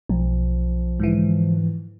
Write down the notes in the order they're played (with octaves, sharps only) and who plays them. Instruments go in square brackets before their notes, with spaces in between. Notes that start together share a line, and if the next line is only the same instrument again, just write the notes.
[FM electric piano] B1 [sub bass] F3
[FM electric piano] G#2 D3 E3